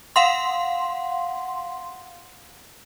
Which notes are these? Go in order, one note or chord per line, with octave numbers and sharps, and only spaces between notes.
F5 F#5 C6